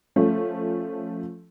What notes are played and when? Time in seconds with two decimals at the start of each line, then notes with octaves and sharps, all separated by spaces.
0.16 F3 A3 C#4